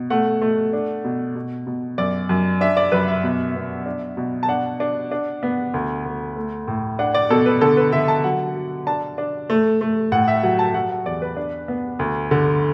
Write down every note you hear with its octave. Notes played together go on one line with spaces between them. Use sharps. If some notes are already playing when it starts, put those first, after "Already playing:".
Already playing: B2
A3 F#5
A3
D4
B2
B2
B2
F#2 D5
F#2
D4 E5
D5
F#2 B4
E5
B2
B3
D4
B2
A5
D4 F#5
D4
D4
B3
D2
D2
A3
A2
D4 F#5
D5
B2 A4
B4
D3 A4
B4
D3 E5
A5
F#3 F#5
F#3
D4 A5
D4
A3
A3
A2 F#5
E5
F#3 F#5
A5
F#3 F#5
F#5
E2 D5
B4
D4
B3
D2
D3